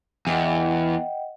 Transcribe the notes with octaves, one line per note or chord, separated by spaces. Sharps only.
E2 D#5 F#5 G5